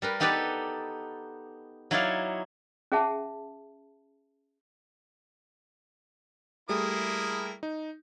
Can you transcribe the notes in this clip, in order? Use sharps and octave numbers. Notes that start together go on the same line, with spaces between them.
G3 A#4 B4
B3 D#4 G4 A4 B4 D5
F#3 D#4 E4 C#5 D5 F5
C#4 G#4 E5 F#5 A5
G3 A3 A#3 E4 G#4 D#6
D#4